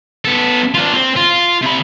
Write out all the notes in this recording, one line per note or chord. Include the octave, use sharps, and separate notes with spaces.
B3 A4
D4 F4
C4
F4
C3 B5